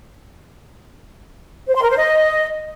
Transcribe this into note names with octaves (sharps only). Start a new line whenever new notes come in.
C5
C6
A#4
C5
D#5